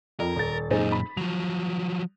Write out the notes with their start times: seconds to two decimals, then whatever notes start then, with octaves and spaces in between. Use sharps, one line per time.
0.20 F2 A#4
0.36 D#1 A6
0.70 F#2 A#2 D#4 G#4 C5
0.92 B5
1.17 F3 F#3 F7